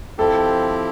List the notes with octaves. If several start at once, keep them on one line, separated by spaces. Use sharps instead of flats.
F3 C4 E4 G4 A4